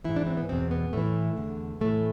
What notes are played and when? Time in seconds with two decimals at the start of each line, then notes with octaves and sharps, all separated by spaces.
0.04 G#2 E3 E4
0.16 D4
0.27 C4
0.37 B3
0.49 E2 B2 C4
0.71 B3
0.93 A2 E3 A3
1.37 E2 D3
1.81 A2 E3 A3